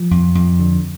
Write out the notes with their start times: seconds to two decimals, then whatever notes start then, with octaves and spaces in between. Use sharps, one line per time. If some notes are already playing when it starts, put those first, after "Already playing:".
Already playing: F3
0.11 F2
0.35 F2
0.59 D3